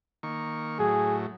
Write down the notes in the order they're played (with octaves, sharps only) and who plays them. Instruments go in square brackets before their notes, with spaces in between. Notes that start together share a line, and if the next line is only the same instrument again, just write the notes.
[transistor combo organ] D#3 A#3 C#6
[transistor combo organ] A2 F#3 [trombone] G#4